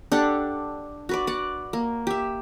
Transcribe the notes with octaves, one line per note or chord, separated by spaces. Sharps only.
D4 G4 A4 F#5
F#4 B4 D5
D5 F#5
A#3
G4 E5